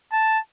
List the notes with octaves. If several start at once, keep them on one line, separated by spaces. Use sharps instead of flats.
A5